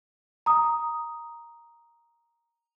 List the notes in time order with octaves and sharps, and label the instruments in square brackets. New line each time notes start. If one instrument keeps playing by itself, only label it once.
[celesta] A#5 D#6